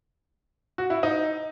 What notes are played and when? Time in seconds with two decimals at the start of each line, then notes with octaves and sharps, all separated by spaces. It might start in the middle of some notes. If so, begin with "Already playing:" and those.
0.78 F#4
0.90 E4
1.03 D#4